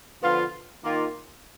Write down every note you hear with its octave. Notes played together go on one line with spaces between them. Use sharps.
D3 F3 B3 F4
D#3 A#3 F4